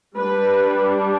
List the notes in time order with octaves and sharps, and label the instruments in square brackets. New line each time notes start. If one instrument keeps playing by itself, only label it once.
[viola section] G3 D4 B4